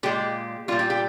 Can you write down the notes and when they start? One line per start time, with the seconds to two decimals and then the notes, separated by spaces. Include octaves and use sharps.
0.03 A#2 G#3 G4
0.68 A#2 G3 F4
0.79 G4
0.90 G4